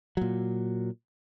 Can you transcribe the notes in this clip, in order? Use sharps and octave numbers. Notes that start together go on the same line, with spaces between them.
A#2 F#3